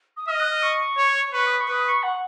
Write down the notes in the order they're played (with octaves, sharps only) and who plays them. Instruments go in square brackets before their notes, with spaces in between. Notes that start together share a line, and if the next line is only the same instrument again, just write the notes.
[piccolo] D#6
[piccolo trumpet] D#5 [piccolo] F6
[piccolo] F#6
F6
C#6
[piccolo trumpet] C#5
[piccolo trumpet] B4 [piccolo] C#6
[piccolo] D#6
C#6
[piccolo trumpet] B4 [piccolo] D#6
[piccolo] C#6
F#5